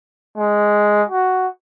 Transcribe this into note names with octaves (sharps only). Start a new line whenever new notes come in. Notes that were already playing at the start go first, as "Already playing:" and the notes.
G#3
F#4